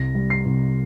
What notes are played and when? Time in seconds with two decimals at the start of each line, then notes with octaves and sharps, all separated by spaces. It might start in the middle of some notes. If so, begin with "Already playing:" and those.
Already playing: C2 A#6
0.15 G3
0.30 C7
0.46 C2